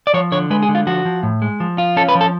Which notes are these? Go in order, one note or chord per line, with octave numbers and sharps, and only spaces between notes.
D5
F3 C#5
D3 C#5
G#3 B4
G#4
D3
F4
F3 F#4
F3
A2
G#3
F3
F4
C#4 A4
B4
F3
A4